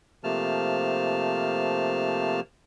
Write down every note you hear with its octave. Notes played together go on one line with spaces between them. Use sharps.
C3 F3 A3 A#3 A5 F6